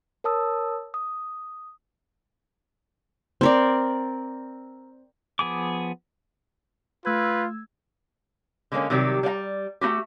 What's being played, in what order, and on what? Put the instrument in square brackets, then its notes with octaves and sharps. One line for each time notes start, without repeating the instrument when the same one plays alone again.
[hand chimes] A#4 C#5 A5 D#6 E6
D#6
[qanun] C4 A#4 D5
[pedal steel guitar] F3 B3 G#4 D6
[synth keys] A3 E6 G#6 [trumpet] F4 [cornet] B4
[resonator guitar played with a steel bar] D3 G#3 A#3 C4 C#4
C3 D#3 F#3 G3 G4
G3 D5 F5 A#5
A3 D#4 F#4 G4